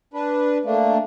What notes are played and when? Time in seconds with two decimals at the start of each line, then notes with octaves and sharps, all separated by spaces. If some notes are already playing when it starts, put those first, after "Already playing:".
0.14 D4 B4
0.65 A3 A#3 D4